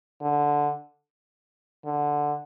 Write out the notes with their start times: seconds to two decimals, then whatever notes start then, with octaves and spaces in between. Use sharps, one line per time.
0.21 D3
1.85 D3